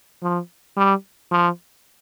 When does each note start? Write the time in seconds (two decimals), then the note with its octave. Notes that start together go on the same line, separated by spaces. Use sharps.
0.23 F3
0.77 G3
1.32 F3